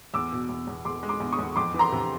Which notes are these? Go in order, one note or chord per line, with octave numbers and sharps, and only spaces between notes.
E2 D6 E6
B2
E2
E2
E2 C6 D6
G#3
C6 D6
E2
C#6 D#6
E2
F2 C6 D6
E3
A#5 C6
C3